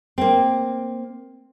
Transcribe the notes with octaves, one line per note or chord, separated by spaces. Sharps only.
A#3 C4